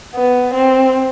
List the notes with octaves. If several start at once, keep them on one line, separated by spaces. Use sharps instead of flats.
B3
C4